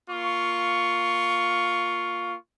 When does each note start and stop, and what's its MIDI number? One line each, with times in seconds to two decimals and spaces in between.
0.10 2.35 58
0.10 2.35 65
0.10 2.35 85